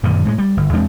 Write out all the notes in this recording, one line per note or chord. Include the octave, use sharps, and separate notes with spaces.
F#2 A#2 D3 D#3
A2 F#3 G#3
G3
G1
E2 G#3 C4 D4